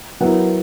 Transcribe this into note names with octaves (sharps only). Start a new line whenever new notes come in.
F#3 B3 E4 A#4